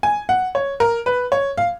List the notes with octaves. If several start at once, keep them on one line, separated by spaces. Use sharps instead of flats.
G#5
F#5
C#5
A#4
B4
C#5
F5